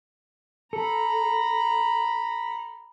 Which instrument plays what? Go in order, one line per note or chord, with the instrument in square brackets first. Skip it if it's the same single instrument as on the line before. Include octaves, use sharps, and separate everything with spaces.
[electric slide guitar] A4 [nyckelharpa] A#5 B5